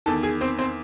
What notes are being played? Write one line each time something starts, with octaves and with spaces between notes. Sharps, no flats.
E2 D#3 A4 A5
G#4 G#5
C4 C5
C4 C5